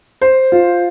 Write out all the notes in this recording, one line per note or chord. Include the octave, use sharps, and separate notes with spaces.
C5
F4